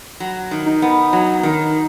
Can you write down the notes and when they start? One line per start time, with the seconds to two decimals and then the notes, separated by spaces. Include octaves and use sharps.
0.20 F#3
0.51 D#3
0.66 D#4
0.82 B3
1.13 F#3
1.43 D#3